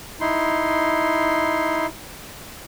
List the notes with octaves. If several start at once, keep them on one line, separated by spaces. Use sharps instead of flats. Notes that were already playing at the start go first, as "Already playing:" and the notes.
D#4 E4 C6